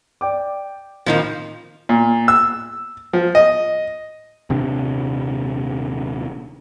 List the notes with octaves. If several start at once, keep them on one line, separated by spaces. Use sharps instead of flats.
D5 G5 D6
F2 A#2 D#3 F3 D#4
A#2
E6
F3
D#5
D#1 C3 C4 D4